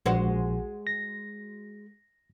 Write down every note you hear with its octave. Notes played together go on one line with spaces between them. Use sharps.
A#1 G#3 F#4 C5
A#6